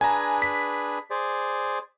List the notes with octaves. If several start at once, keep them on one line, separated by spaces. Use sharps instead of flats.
D4 G#4 B4 G#5 A#5
B6
G#4 C5 D5